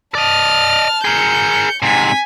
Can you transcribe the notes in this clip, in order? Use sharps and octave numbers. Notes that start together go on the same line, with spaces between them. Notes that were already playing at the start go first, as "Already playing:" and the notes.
D5 D#5 A5 F6
G#4 A#4 G6 C#7
G#2 C3 G#5 B6